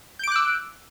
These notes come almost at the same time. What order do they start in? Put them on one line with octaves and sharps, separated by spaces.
G6 D7 D6 F#6 E6